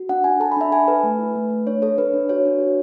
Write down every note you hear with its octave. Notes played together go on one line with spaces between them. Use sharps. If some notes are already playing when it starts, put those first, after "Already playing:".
Already playing: F#4
D4 F#5
D4 G#5
A4 A5
B5
D4 E5
A4 G#5
A4 B4
A3
E4
A3
A3
D4 C#5
A4 C#5
D4 B4
D4
F#4 C#5
D4
F#4